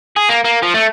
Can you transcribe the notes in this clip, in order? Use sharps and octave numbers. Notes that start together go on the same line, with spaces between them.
G#4
A#3
A#3
F3
A3